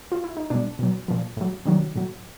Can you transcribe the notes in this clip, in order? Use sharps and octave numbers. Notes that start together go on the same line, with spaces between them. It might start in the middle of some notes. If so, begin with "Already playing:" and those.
F4
E4
D#4
B2 G3 D4
B2 F#3
A#2 F3
A2 F#3
C3 D#3 F#3 D4
A2 F#3